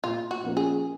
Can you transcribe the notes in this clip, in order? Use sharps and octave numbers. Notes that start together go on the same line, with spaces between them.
A#2 F4
F#4
F3 A#3 C#4
G#4